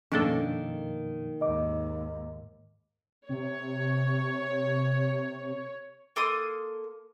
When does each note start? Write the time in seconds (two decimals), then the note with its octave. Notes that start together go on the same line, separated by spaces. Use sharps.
0.12 F#2 B2 D#3 F3 A#3 C#4 D4 A4
1.41 D#2 G#2 D#5 D6
3.29 C3 C#5
6.16 A#3 A4 C6 D#6